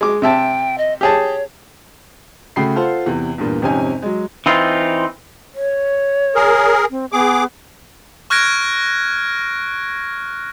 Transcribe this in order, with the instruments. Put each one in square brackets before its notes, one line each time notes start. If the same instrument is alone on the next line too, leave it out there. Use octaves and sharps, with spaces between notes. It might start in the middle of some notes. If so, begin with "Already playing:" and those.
[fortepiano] G#3 D6 [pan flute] F#4
[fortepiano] C3 E5 A5 [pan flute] G5
[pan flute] D#5
[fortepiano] G4 G#4 A5 [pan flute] C#5
[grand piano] C#3 A3 F#4 G5 B5 C7
F4 A4 C5 F#5
E2 C3 E3
E2 G2 A#2
G#1 F2 C3 C#4 D#4 G#5
F#3 G#3
[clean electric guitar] E3 C4 D#4 F4
[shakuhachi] C#5
[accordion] G#4 A#4
[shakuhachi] C4
[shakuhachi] B3 [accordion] G#4 D6
[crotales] C#6 F6 F#6 G#6 A#6 D7